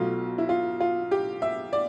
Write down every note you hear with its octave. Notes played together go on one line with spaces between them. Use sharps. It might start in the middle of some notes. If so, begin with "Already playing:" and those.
Already playing: B1 B2 A3 F4
E4
F4
F4
G4
E5
D5